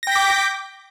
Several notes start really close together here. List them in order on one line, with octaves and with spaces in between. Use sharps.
A#6 G5 B6 D6 G6